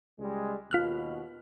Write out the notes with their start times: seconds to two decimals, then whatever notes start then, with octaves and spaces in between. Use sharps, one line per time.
0.19 C#2 G3 G#3
0.71 D#2 B2 F4 F6 F#6